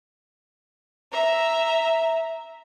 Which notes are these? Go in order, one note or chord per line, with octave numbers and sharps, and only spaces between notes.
E5 A#5